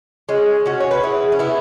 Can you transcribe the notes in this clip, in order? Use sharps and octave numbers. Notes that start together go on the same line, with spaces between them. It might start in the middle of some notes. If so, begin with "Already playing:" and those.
G#3 C#4
C#4 F#4
C#5
B4
E4 G#4
C#4
B3 E4